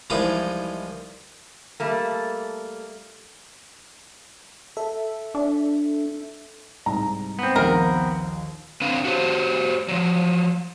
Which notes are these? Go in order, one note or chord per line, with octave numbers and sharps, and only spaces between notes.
C2 E3 F3 G#3 D#4
G3 A3 A#3
A4 E5
D4
C2 G#2 A#5
B3 C4
A#1 D#2 A#4
C4 D4 B4 F5
F#4 G4 C5
F3 F#3